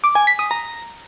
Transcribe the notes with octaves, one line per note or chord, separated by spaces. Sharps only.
D6
G#5
B6
D#6
A#5